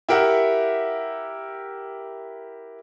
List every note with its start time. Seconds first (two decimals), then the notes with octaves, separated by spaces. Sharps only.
0.09 E4 G4 A#4 E5 F#5